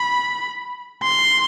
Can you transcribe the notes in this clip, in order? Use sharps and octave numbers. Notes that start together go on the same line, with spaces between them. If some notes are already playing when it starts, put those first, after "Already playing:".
Already playing: B5
C6